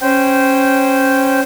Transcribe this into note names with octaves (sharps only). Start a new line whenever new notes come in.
C#4 C5 G5